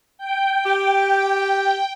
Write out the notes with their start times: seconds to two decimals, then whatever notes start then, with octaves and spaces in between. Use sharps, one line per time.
0.18 G5
0.65 G4